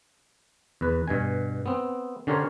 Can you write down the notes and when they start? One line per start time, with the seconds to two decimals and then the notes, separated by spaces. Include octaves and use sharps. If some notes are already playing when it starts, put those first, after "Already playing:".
0.81 E2 B4
1.08 G2 B2 G#5
1.66 B3 C4
2.27 D3 C#4 G4 A#4 C5 C#5